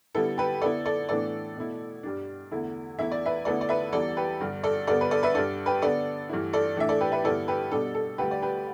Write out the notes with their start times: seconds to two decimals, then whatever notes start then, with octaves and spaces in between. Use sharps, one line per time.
0.15 D3 G3 B3 E4 A4
0.38 G4 B4
0.61 D3 B3 E4 A4 D5
0.86 A4 D5
1.09 A2 E3 B3 D4 A4 D5
1.56 B2 A3 E4
2.03 G2 G3 D4
2.51 E2 D3 A3 E4
2.98 E2 E3 A3 E4 E5
3.12 D5
3.26 B4 E5
3.45 D2 D3 B3 E4 A4 D5
3.61 D5
3.69 B4 E5
3.93 E2 E3 G3 A4 D5
4.17 G4 B4
4.41 G2 D3 G3
4.63 A4 D5
4.87 G2 D3 B3 A4 D5
5.01 B4
5.11 A4 D5
5.23 B4 E5
5.34 G2 G3 D4 A4 D5
5.66 G4 B4
5.82 D3 B3 D4 A4 D5
6.29 G2 E3 A3 E4
6.53 A4 D5
6.77 A2 E3 A3 D4 E5
6.89 A4 D5
7.01 G4 B4
7.12 B4 E5
7.24 G2 D3 B3 E4 A4 D5
7.48 G4 B4
7.71 B2 G3 D4 A4
7.95 A4
8.18 D2 D3 G3 G4 B4
8.31 D5
8.42 G4 B4